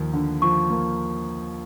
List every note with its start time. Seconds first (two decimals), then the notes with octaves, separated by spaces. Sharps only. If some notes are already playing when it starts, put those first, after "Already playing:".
Already playing: D#2 F3 A#3
0.13 D3
0.42 F3 C#6
0.70 A#3